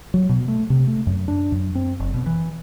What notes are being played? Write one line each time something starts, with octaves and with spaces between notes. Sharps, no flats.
F#3
B2
A3
C3
A3
F#2
D4
F#2
C4
F#1
B2
E3